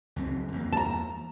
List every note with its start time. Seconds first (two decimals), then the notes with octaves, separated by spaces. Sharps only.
0.16 C#2 F#2 C4
0.52 E2 E3 A#3
0.72 A5 A#5